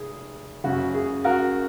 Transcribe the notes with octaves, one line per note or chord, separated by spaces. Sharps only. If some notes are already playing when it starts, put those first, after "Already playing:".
Already playing: F1 G#4
F#1 F#2 C#3 F#4
G#4
F#4 A#4